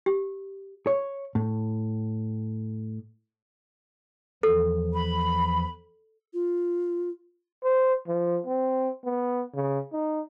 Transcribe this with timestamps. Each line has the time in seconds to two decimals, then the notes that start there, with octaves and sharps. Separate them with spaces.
0.06 G4
0.87 C#5
1.35 A2
4.43 E2 E3 F3 A4
4.94 B5
6.34 F4
7.64 C5
8.07 F3
8.46 C4
9.05 B3
9.54 C#3
9.92 D#4